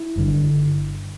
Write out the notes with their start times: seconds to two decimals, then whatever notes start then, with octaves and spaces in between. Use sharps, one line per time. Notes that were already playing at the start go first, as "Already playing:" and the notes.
Already playing: E4
0.16 G1 G2 D3